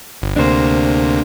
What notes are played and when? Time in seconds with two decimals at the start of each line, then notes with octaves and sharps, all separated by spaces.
0.22 G1
0.36 D2 C3 A#3 D4 C5